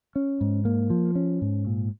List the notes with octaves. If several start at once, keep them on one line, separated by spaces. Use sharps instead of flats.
C#4
G#2
A#3
F3
C#4
G#2
A#2